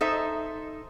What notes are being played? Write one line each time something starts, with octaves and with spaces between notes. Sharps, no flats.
D#4 A4 C5 E5